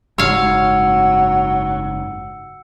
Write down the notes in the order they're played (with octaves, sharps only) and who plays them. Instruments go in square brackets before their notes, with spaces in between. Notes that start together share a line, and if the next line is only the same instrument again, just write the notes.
[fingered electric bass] F#1 G#2 [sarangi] F#3 [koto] C#5 F5 [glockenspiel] E6 C#7